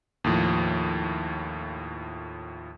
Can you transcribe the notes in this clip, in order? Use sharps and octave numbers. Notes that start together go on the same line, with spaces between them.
D#2 A2 F3